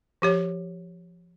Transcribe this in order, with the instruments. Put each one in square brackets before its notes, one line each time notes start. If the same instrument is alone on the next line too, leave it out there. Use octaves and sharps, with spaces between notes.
[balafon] F3 G4 C#5